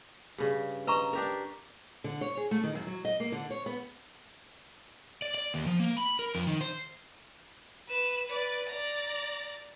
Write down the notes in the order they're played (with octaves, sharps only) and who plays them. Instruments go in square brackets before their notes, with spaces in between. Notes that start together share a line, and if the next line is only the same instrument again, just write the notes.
[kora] G2 C#3
[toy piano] B4 A#5 C#6 [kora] D#5
[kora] D4 G4 A#4
[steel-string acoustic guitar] D3
C#5
G#4
A3
D#3
F#2
F#3
D#5
A#3
D3
C#5
B3
[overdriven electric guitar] D5
D5
D#2
F3
A#3
B5
A#4
F2
D#3
C5
[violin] B4 E7
B4 D5
D5 A#5